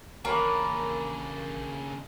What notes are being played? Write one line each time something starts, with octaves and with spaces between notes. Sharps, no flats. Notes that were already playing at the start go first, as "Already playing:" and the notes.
A1 C#3 A#3 D4 A#4 C#5 B5